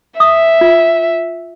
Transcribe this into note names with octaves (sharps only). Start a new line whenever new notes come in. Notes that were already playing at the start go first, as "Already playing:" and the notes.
E5 D#6
F4